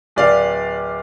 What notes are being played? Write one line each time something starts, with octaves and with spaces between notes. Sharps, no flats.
D1 D5 F5